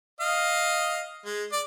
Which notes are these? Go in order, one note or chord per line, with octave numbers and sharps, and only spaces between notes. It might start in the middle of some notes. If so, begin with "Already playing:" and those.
D#5 F5
G#3
D5